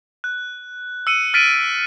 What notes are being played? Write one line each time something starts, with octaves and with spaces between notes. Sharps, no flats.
F#6
E6 C#7 D#7
F6 A6 B6 D7 D#7